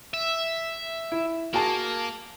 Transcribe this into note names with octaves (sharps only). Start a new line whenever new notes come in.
E5
E4
A#3 F#4 G#4 A5